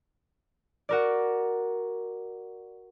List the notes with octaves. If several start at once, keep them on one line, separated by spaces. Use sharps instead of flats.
F#4 A#4 D5